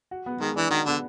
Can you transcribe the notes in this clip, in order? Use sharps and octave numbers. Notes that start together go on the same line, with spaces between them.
F#4
B3
D#3 G#3
E3 D4
D#3 F#4
D3 B3